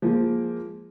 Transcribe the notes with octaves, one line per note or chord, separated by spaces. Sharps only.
F3 G#3 A#3